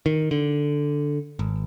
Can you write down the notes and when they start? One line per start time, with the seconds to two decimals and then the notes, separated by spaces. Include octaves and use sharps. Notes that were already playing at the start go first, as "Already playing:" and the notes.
0.06 D#3
0.31 D3
1.39 G#1